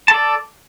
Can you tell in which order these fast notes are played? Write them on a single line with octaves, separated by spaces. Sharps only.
A5 A4 D5